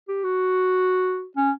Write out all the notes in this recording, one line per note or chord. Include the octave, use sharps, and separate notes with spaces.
G4
F#4
C#4